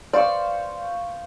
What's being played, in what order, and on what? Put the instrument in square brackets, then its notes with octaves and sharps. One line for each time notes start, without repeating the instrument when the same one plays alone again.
[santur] C5 F5 C#6 [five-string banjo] D5